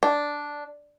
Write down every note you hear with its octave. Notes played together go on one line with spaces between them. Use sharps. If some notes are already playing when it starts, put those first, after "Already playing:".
D4